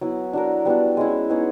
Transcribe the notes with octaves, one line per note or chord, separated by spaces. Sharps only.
F#3 B3 E4
D4 F#4 A#4
G3 B3 D4 F#4
G#3 C#4 E4
B3 D#4 G#4 C#5